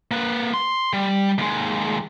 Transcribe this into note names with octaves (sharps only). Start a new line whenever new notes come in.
A#3 B4
C6
G3
D#2 G#3